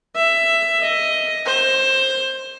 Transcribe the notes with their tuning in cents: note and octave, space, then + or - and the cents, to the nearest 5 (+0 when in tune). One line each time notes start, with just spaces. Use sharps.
E5 +10
D#5 +5
C5 +20